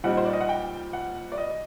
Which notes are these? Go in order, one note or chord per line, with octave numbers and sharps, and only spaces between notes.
A#2 G3 C4 D#4 F#5
C5
D5
D#5
F#5
G5
F#5
D5
D#5